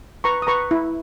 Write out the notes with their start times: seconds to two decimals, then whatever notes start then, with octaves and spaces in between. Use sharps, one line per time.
0.24 B4 A#5 C#6
0.42 D#6
0.47 B4 A#5 C#6
0.71 E4